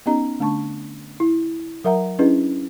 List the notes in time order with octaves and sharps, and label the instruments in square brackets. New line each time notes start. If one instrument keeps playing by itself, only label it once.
[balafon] B3 C#4 D#4 G4 D#5 A#5
D3 A3 D4 A5 C#6
E4
F#3 A#4 E5 F#5 A#5
C#4 D4 E4 G#4 B4 D#5